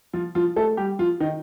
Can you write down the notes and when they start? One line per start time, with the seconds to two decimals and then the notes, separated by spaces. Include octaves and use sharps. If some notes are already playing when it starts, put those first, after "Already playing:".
0.13 F3 F4
0.35 F3 F4
0.56 A3 A4
0.77 G3 G4
0.99 F3 F4
1.20 D#3 D#4